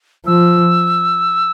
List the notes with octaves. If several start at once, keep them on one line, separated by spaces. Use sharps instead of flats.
F3 E6